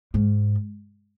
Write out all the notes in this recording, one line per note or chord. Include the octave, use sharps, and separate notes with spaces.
G#2